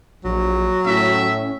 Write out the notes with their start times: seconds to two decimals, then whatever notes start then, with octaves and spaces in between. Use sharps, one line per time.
0.25 A#1 F#3
0.86 A2 C#4 E5